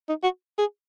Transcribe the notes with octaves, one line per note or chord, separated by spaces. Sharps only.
D#4
F#4
G#4